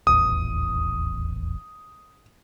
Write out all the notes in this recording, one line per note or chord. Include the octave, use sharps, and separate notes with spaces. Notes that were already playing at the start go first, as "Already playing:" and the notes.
D#1 A1 E2 D#6